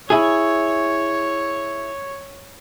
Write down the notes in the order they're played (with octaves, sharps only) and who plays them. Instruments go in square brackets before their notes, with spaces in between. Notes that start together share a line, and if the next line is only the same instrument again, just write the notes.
[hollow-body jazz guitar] E4 G#4 [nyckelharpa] C#5